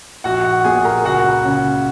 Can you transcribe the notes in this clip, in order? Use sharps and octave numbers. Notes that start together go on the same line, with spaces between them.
A#1 F#4 F#5
F#4 F#5
A#2 G#4 G#5
A#4 A#5
C#2 F#4 F#5
C#3